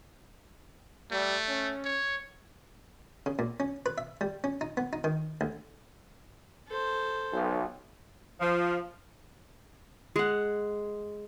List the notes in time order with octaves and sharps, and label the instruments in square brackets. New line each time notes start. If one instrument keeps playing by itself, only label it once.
[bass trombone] G3 [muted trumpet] A3
[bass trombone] C#4
[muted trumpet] C#5
[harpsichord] C#3
A#2
C#4
B4
E5
G3
C#4
D#4
B3
D#4
D#3
D2
[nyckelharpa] A4 C5
[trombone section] B1
[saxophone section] F3
[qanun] G#3 F#5